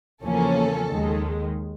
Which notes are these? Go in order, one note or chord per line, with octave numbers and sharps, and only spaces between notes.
E2 C#3 F3 A#3 C#4 A4
D#2 D#3 G#3